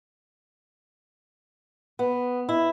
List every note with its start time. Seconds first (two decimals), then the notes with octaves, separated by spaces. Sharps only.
1.99 B3
2.49 E4